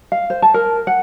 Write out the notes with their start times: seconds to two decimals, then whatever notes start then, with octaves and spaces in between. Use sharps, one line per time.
0.12 F5
0.30 C5
0.42 A5
0.54 A#4
0.87 F#5